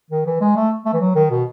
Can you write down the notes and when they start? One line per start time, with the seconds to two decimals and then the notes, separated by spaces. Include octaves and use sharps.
0.10 D#3
0.26 E3
0.40 G#3
0.56 A3
0.85 A3
0.93 E3
1.00 F#3
1.15 D#3
1.30 B2